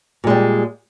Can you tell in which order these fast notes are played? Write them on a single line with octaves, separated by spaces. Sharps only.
A#2 G#3 G3